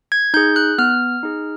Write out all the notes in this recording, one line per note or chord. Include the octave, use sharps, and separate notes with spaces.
G#6
D#4 G#4 G6
F#6
B3 F6
D#4 G#4